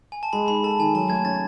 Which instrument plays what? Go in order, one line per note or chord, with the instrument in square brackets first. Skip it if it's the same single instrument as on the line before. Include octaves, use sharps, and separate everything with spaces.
[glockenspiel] G#5
A5
[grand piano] G#3 [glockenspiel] B5
[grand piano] D#4 [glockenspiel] B5
[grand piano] A4 [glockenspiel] A5
[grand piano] D#3 [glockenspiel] G#5
[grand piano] F#3 [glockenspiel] A5
[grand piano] A3 [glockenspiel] G#6
[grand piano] C#4 [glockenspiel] A6